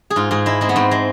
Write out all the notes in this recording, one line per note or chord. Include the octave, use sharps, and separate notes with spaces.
G#4
G#2 F4
G#2 G#4
G#3 E4
G#3 C4
B3
G#2 C4
G#3